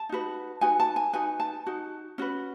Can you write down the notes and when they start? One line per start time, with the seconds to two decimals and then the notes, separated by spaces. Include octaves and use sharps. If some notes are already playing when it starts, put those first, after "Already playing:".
Already playing: A5
0.09 D#4 F#4 B4
0.61 D#4 F#4 B4 G#5
0.80 A5
0.96 G#5
1.13 D#4 F#4 B4 G#5
1.40 A5
1.66 D#4 F#4
2.18 C#4 F#4 B4